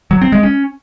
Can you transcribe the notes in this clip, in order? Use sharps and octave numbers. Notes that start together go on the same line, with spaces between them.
F#3
C4
G#3
C#4